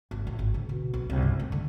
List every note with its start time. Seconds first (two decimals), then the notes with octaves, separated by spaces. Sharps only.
0.11 G#1
0.27 A2
0.39 G#1
0.54 D3
0.69 B2
0.94 B1
1.10 C2
1.22 G2
1.39 A3
1.52 D3